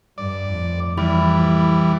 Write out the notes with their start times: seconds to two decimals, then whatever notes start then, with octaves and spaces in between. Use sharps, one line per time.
0.18 G2 D5
0.49 F2 A2
0.98 E3 G3 E4